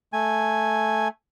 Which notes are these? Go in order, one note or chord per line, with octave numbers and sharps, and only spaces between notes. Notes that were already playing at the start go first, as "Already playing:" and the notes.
A3 G#5